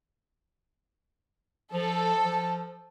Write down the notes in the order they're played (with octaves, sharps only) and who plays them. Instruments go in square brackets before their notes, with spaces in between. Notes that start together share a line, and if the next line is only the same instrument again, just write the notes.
[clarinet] F3 [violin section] A4
[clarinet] F3